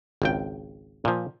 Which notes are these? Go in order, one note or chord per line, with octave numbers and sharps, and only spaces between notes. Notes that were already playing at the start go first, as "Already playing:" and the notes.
G#1 C#2 G5
A#2 F3